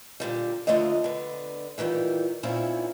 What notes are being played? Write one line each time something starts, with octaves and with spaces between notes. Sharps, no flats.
A#2 D3 G3
D#2 D3 F3 A3 D#5
D3 B3
A#2 D#3 E3 G3
A#2 D#3 C4 C#4 E4